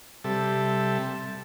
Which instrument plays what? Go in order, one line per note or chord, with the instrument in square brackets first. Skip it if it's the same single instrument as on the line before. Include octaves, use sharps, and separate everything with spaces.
[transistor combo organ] C3 G3 A4 E5